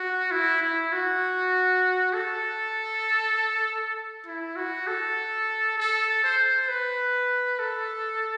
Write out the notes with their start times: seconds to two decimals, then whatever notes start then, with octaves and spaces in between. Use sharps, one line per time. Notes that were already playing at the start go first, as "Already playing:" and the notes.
Already playing: F#4
0.31 E4
0.62 E4
0.93 F#4
2.14 A4
4.26 E4
4.56 F#4
4.87 A4
5.78 A4
6.24 C5
6.69 B4
7.59 A4